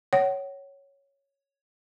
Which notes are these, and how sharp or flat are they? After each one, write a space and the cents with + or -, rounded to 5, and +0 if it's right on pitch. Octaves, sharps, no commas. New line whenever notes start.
C#5 +0 F#5 +30